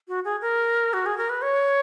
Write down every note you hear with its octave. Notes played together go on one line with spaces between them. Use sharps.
F#4
G#4
A#4
F#4
G#4
A#4
B4
C#5